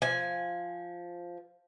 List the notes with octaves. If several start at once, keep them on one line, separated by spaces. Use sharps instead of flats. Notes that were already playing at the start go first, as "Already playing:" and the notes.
F3 G#5